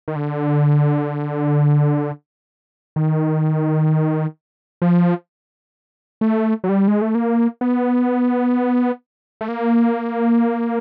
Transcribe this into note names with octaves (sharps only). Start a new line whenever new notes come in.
D#3
D3
D#3
F3
A3
F#3
G3
G#3
A3
A#3
B3
A3
A#3